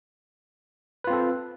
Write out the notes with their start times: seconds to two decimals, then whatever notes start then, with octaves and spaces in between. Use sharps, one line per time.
1.04 B4
1.07 F4
1.10 C4
1.13 A4